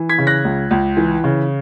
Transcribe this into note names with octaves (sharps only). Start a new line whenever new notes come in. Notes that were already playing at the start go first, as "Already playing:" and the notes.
Already playing: E3
G#6 B6
C#3
F#6 A#6
C#2
C#2
E3
C#3